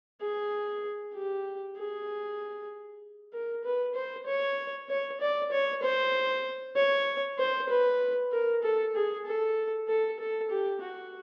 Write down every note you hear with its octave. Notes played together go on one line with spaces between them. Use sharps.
G#4
G4
G#4
A#4
B4
C5
C#5
C#5
D5
C#5
C5
C#5
C5
B4
A#4
A4
G#4
A4
A4
A4
G4
F#4